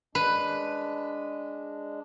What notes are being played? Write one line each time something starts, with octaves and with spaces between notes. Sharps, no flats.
G#3 D4 B4